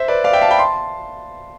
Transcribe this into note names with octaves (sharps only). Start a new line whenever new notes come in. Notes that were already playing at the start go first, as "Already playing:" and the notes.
Already playing: C5 E5
B4 D5
D5 F5
E5 G5
F5 A5
G5 B5
A5 C6